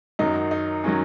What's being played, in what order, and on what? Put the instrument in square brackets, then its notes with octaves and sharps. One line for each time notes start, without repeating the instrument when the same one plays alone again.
[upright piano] F#2 D#3 F#3 D#4
D#4
D#3 F#3 C#4